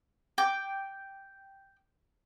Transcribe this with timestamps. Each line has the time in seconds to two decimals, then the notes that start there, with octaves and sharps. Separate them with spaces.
0.38 G5 D6